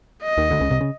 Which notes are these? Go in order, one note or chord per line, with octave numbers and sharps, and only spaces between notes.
D#5
D#2 D#3
D2 D3
C#2 C#3
C2 C3
C#3